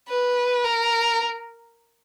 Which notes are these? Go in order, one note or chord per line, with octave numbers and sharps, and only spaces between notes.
B4
A#4